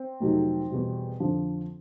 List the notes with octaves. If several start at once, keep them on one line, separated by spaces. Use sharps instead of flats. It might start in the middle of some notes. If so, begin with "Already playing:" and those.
Already playing: C4
F2 C3 D#3 F#3 A3
E2 B2 G3
F2 D3 F3